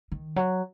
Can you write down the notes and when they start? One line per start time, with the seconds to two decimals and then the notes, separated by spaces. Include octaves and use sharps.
0.12 D#3
0.36 F#3